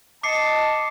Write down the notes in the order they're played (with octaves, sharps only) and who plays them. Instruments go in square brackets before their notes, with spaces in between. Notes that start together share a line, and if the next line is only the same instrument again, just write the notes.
[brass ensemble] D#5 A5 [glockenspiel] D6 C7 C#7